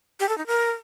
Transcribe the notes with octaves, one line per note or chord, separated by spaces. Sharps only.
G4
A4
D#4
A#4